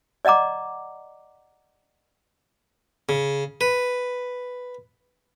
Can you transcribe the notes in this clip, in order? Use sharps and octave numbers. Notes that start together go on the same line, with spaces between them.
D5 D#5 F#5 A#5 D6
C#3
B4